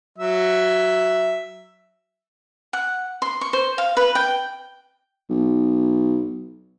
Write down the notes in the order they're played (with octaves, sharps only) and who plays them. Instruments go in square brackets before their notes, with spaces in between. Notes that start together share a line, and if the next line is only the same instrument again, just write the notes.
[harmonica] F#3 E5
[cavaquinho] F#5
C6
C#6
C5
F5
B4
G5
[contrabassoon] B1